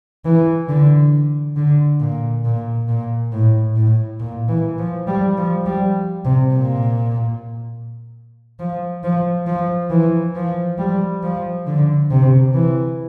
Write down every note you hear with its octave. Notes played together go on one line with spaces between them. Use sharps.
E3
D3
D3
A#2
A#2
A#2
A2
A2
A#2
E3
F3
G3
F3
G3
C3
A#2
F3
F3
F3
E3
F3
G3
F3
D3
C3
E3